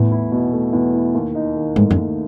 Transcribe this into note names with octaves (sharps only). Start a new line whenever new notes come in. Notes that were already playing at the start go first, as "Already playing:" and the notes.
Already playing: E2 A2 E4
E4
B2
A3
E2
E4
D#2
D#4
D#3
G#2 A3
F#2
D#2